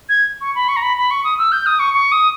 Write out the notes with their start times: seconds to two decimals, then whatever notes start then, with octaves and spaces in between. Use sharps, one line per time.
0.09 G#6
0.41 C#6
0.55 B5
0.68 C#6
0.76 A#5
0.82 B5
0.97 B5
1.11 C#6
1.24 D#6
1.38 E6
1.52 G6
1.66 D#6
1.79 C#6
1.94 C#6
2.12 D#6